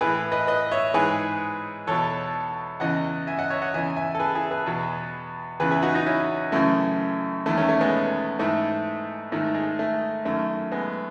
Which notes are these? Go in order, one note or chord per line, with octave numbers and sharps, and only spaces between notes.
A2 E3 G#4 B4
B4 D#5
B4 D#5
C#5 E5
G#2 E3 G#4 B4
E2 B2 A4 C#5
E2 C#3 E3 D#5 F#5
E5 G#5
D#5 F#5
C#5 E5
D#5 F#5
E2 C#3 E3 E5 G#5
E5 G#5
A4
G#4 B4
E4 G#4
G#4 B4
E2 B2
E2 C#3 E3 G#4 B4
E4 G#4
D#4 F#4
D#4 F#4
C#4 E4
F#2 C#3 E3 A3
E2 D#3 A3
A3 C#4
A3 C#4
G#3 B3
G#2 E3 A3
G#2 D#3 A3
G#3
A3
F#2 D#3 A3
G#3 B3